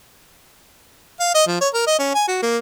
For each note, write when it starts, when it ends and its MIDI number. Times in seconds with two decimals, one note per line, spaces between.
1.20 1.31 77
1.35 1.44 75
1.47 1.59 53
1.61 1.68 73
1.74 1.87 70
1.87 1.98 75
1.99 2.13 61
2.14 2.24 80
2.28 2.39 66
2.42 2.57 58